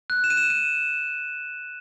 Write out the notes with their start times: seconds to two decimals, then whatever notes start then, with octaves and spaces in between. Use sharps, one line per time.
0.10 F#6
0.24 E7
0.30 D#7
0.37 E7
0.50 D#7